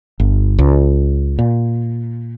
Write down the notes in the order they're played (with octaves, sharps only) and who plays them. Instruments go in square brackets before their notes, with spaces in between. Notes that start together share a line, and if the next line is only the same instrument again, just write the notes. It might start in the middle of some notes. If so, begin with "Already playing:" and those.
[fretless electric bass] G1
C#2
A#2